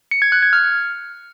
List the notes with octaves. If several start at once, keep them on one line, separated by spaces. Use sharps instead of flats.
C#7
G#6
F#6
G#6
F6